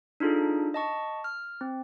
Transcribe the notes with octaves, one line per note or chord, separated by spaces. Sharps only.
D4 D#4 F4 G#4 A4
D#5 A5 C#6
F6
C4